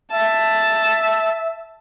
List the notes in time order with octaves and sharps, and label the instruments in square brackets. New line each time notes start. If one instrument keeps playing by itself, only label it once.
[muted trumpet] E5 [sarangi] A5